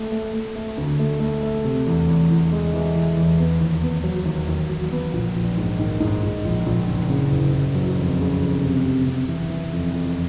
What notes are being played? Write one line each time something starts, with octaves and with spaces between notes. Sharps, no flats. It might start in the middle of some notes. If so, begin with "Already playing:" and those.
Already playing: A3
A3
A3
A3
D2
A3
A3
A3
C3
E2
E2
E2
G#3
E3
E3
E2
B3
D#2
B3
F#3
D#2
D#2
F#3
B3
A#1
A#1
G#2
D#3
G#2
G#2
A#1
A#1
F#1
C#3
F#1
F#1
F#3
F2
C#3
F2
C3
C3
C3
E3
E3
F2
F2